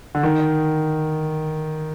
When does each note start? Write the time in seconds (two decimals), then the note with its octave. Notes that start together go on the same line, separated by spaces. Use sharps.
0.15 D3
0.23 D#3